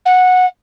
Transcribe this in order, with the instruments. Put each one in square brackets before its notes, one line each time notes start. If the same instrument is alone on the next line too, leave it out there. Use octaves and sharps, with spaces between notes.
[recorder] F#5